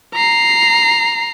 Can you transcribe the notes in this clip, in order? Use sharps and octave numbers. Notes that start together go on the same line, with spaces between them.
A#5 C7